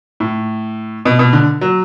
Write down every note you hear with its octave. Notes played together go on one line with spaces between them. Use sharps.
A2
B2
B2
D3
F#3